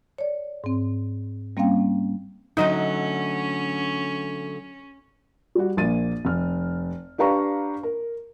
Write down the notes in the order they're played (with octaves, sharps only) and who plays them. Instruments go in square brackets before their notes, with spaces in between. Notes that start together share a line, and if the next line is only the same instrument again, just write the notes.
[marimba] C#5 D5
G#2 C4
G3 A#3 C4 C#4 F5 G5
[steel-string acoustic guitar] D3 F#3 A3 [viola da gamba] C#4 [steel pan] D#4 D#5
[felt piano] G3 F#4
A#1 A#3 A6 D#7
F1 F6
D4 G4 B4 F5 A#5 C#6
A#4